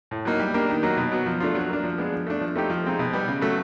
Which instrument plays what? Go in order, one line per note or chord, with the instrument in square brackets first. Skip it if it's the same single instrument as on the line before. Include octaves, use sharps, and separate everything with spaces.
[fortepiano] A2
F#3 A#3 D#4
G3
A#3 D4 G4
D#3
F#3 A#3 D#4
B2
F#3 B3
F3
A3 D4 F4
F#3
A#3 D4
F3
G#3 B3 D4
F3
A3 D4
F3
A3 C4 D#4 G4
F3
G#3 C4 D#4
B2
G3 B3
C#3
F#3 A3